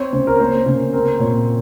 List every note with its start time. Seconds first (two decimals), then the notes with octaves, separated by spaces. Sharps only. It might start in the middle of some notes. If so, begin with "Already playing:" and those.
Already playing: C4 C#5
0.13 C#3 C5
0.27 A#4
0.40 A#3 C5
0.66 C#3
0.93 C4 A#4
1.19 A#2 C#5